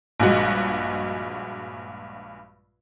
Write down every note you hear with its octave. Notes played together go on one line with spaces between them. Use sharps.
A#1 G2 G#3 F#4